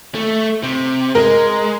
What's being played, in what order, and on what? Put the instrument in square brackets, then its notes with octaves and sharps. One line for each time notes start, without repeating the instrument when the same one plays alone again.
[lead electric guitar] A3
C3
[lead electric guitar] G#3 [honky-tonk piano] A#4